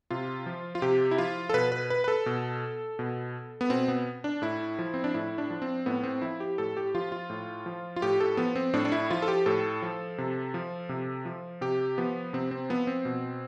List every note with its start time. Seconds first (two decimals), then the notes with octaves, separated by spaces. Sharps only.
0.11 C3 F4
0.46 F3
0.75 F4
0.82 C3 G4
1.11 E4
1.18 F3 F4
1.49 A4
1.54 B2 B4
1.72 B4
1.90 B4
2.04 B4
2.08 A4
2.26 B2
2.99 B2
3.61 B3
3.70 B2 C4
3.88 B3
4.24 D4
4.42 A2 E4
4.79 F3
4.94 C4
5.04 D4
5.14 A2 E4
5.38 D4
5.50 F3
5.62 C4
5.86 A2 B3
6.03 C4
6.22 F3 E4
6.40 G4
6.58 A2 A4
6.77 G4
6.95 F3 F4
7.12 F4
7.30 A2
7.66 F3
7.96 F4
8.02 A2 G4
8.20 A4
8.37 F3 B3
8.55 C4
8.73 A2 D4
8.85 D4
8.92 E4
9.10 F3 F4
9.22 A4
9.28 G4
9.46 A2 A4
9.82 F3
10.18 C3
10.54 F3
10.89 C3
11.25 F3
11.61 C3 G4
11.98 F3 B3
12.33 C3 C4
12.51 C4
12.70 F3 B3
12.87 C4
13.05 B2